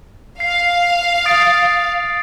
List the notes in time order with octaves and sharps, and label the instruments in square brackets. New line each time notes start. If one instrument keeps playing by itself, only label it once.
[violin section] F5 [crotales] C7
[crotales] D#6 A6 D7